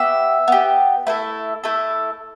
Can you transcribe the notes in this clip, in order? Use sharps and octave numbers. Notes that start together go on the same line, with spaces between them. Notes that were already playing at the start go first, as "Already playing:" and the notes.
Already playing: B3 G4 E5
B3 G4
A3 E4 A4 B4
A3 E4 A4